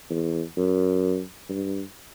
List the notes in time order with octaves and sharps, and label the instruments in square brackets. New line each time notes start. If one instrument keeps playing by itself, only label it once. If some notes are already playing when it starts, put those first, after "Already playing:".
[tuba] E2
F#2
G2